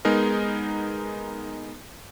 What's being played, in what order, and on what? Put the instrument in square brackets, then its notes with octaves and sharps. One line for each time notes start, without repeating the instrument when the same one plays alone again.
[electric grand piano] G#3 B3 D#4 G#4 A#4